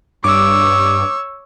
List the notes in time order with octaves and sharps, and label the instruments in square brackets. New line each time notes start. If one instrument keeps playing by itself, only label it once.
[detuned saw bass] G2 [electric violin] C#5 E6 [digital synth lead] D6